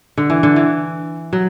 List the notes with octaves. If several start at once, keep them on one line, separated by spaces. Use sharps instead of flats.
D3
E3
D3
E3
F#3